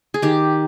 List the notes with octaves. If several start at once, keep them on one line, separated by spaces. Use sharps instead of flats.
G#4
D#3 G4